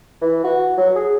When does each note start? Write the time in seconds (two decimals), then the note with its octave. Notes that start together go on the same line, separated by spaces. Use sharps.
0.22 E3
0.44 F#4
0.78 F#3
0.96 G#4